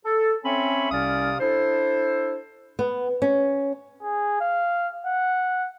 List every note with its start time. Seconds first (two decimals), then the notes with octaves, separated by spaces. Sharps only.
0.05 A4
0.43 C4 C#4 C#5 E5 G#5 B5
0.91 C2 C3 C#4 D5 F5 D#6
1.40 D4 E4 A4 C5
2.79 B3
3.22 C#4
4.02 G#4
4.41 F5
5.05 F#5